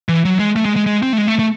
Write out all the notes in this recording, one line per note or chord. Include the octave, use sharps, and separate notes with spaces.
E3
F#3
G#3
A3
G#3
G#3
G#3
C4
A3
G#3
A3
A3